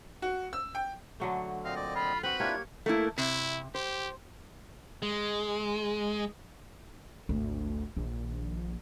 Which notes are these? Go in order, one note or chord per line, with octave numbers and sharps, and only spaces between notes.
F#4
E6
G5
D3 F#3 A3
A#2 C4 D#5 F5
D5
F4 B5
C4 F#4 B4 F#7
A#3 D4 E4 F4 G4 C#5 G#6
A3 A#3 E4
C3 E4
G4 C5
G#3
G#1 D2 A3
A#1 D#3